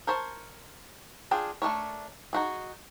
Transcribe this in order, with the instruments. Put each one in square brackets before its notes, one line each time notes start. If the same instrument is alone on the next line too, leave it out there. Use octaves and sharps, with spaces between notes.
[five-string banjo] A#4 C5 C#5 A5
D4 F4 G#4 G5
A3 D4 A#4 C#5
D#4 F#4 G#4